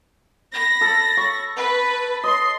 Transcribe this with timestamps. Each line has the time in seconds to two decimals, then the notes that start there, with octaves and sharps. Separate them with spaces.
0.52 B5 A#6
0.81 A4
1.17 C#6
1.57 B4
2.23 D#5 C6